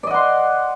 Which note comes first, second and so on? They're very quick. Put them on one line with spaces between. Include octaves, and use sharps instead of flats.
D5 D#5 F#5 C6